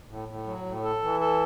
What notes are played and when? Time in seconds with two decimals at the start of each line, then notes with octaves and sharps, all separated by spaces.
0.09 A2
0.29 A2
0.47 F#3
0.66 A2
0.84 A4
1.02 E3
1.20 A4